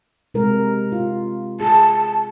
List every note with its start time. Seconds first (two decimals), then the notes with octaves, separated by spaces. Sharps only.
0.34 C3 G#3 A#4
0.92 F4
1.60 G#4 A5